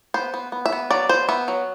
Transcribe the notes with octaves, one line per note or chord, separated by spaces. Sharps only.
B3 C5
B3
B3
E5
B3
F#3 D5
B3 C5
B3 E5
F#3